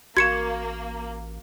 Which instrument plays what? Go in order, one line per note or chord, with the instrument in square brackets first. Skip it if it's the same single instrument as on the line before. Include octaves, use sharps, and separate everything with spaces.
[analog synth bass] A1 [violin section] A#3 [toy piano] F#4 C#6 [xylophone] G#6 C#7 E7